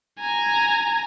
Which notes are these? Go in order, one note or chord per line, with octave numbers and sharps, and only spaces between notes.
G#5 A#5